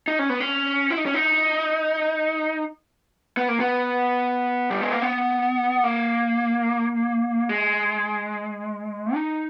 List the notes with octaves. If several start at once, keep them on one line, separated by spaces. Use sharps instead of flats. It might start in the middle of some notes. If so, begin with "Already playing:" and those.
D#4
C#4
B3
C#4
E4
D#4
C#4
D#4
B3
A#3
B3
G3
G#3
A#3
B3
A#3
G#3
D#4